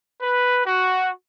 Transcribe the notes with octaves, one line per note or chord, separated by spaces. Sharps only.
B4
F#4